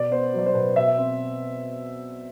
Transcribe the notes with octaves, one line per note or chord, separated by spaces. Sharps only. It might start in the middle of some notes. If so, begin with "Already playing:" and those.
Already playing: B2 D5
B3 C5
F#3
D5
C5
B2 B4
B2 E5
C4